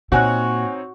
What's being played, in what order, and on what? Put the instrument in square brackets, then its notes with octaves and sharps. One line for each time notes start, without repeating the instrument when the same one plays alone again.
[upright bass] A#2 [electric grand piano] C4 D#4 C#5 [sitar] F#4 [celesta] F#5 G#5 F#6